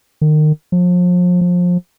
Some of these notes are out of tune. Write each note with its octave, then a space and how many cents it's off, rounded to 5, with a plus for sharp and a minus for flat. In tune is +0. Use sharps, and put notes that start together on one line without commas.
D#3 -30
F3 +35
F3 +25